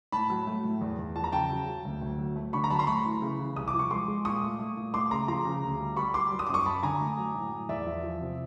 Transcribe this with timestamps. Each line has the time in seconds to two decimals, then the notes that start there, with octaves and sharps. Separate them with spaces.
0.12 A2 A5 B5
0.30 F#3
0.47 A3
0.64 A2
0.81 E2
0.99 E2
1.16 F3 A5
1.24 A#5
1.32 C#3 G5 A5
1.50 F#3
1.67 F#3
1.85 D2
2.02 D2
2.19 F#3
2.36 A3
2.53 D3 B5 C#6
2.64 A#5
2.70 F#3 A5 B5
2.79 A#5 C6
2.87 A3 B5 C#6
3.04 E3
3.22 C#3
3.40 E3
3.56 C2 D#6
3.68 D6
3.74 F3
3.79 C#6
3.91 G#3 C6 D6
4.08 G#3
4.25 A#2 C#6 D#6
4.43 A3
4.59 A3
4.77 A#2
4.94 A3 C6 D6
5.11 C#3 A#5 C6
5.28 F3 A#5 C6
5.45 C#3
5.63 D2
5.80 G3
5.97 G3 B5 C#6
6.14 G3 C6 D6
6.32 F#3
6.39 D#6
6.47 F#2 D6
6.54 C#6 D#6
6.66 F#2 A5 B5
6.83 D3 G#5 A#5
7.01 A3
7.18 F#3
7.35 A2
7.52 A2
7.69 E2 D5 E5
7.86 F3
8.03 F3
8.21 C3